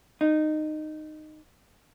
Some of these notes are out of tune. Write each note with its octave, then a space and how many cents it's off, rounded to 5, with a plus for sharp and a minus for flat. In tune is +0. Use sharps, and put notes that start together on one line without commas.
D#4 -15